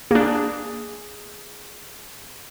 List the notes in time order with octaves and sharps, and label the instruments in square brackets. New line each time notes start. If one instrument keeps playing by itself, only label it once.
[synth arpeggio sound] A#3 D4 [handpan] G#4